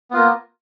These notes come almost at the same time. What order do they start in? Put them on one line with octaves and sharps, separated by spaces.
B3 F4 A#3